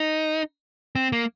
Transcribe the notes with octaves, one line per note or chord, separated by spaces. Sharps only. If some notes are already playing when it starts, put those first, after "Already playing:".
Already playing: D#4
C4
A#3